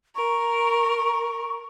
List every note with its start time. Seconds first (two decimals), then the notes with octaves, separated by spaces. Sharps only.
0.16 A#4 C#6